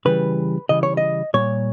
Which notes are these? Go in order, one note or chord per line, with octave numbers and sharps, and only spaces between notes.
C#3 E3 G3 B4
C#3 E3 G3 D#5
C#5
D#5
A#2 G3 C#5